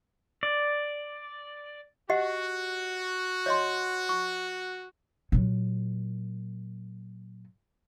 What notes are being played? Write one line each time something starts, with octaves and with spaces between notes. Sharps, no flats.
D5
F#4 G4 D#5 F#5
C#5 D#5 C6
C#6
A#2 F#3